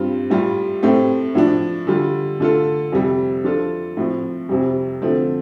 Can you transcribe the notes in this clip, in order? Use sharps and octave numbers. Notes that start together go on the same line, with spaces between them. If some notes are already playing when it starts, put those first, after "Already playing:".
Already playing: G2 G3 C4 F4
A2 G3 F4
A2 A3 C4 G4
A2 F3 D4
D3 G3 F4
D3 A3 F4 A4
F2 C3 G3
F3 D4 F4 A4
A2 F3 C4
F2 C3 G3
D3 F3 A3 C4